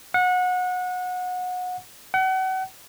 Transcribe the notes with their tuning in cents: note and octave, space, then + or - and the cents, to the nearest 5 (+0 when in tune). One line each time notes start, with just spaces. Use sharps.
F#5 -25
F#5 +35